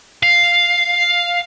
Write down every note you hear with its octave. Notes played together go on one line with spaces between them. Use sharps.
F5